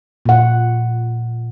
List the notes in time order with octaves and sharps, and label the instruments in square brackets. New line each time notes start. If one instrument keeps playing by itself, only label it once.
[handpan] A#2 F#5